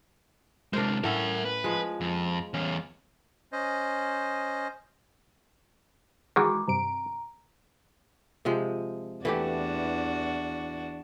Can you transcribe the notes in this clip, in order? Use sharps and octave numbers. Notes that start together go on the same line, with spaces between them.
C3 G#3 D4 A#4 C5
A2 C#4 A#4 E5 F#5
B4
F3 G#3
F2
E2 C#4 F5
C#4 C5 D#5
D#3 E3 G#3 F#4 A#5 D6
G2 C3 A#5 D7
C3 F3 G#3
E2 E3 A3 D4 F#4 G4